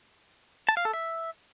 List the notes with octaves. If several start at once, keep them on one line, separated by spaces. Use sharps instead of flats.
A5
F5
A4
E5